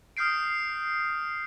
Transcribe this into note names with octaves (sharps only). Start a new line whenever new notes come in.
D#6 F6 G6 C7 D7